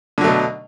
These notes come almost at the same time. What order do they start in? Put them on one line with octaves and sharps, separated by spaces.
D3 F#3 A3 B2